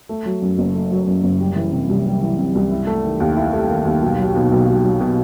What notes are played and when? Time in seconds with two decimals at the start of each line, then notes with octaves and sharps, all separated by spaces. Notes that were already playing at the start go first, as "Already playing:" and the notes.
0.09 A3
0.26 F#3
0.42 F#2
0.58 F#1
0.74 A3
0.91 F#3
1.07 F#2
1.23 F#1
1.40 G3
1.56 E3
1.72 C3
1.89 C2
2.06 G3
2.22 E3
2.38 C3
2.55 C2
2.71 E4
2.87 A3
3.04 D#3
3.20 D#2
3.36 E4
3.53 A3
3.69 D#3
3.85 D#2
4.02 B1
4.19 F#3
4.35 B2
4.52 B1
4.68 B1
4.85 F#3
5.00 B2